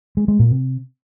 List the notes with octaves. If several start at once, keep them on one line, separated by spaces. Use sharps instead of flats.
G#3
G#3
A#2
C3